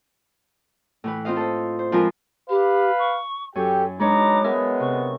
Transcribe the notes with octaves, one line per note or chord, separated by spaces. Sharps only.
A2 E3 B4
C4 F4 C5 D#5 F5
A4 C5
C5
F3 G#3 C4 F4 A#4 B4
G4 B4 F5
C#6
F#2 G4 A4 G5 G#5 C#6
G#3 D4 D#4 B4 C#5 A#5 D6
G#3 B3 A#4 E5 G#5
C3 C#6